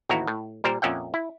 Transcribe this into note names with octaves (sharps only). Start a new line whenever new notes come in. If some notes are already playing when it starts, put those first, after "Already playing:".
A1 D#2 A2 E4 F#4 A#5
A2
A#2 G3 A#4 C5
F2 A#2 C#4 E5 F#5 G5
E4